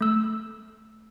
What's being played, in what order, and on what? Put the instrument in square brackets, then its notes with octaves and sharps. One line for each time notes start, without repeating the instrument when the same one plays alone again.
[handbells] A3 E6